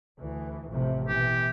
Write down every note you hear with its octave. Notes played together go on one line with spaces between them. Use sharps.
D2 E3
A1 F2 C3
B2 E3 G4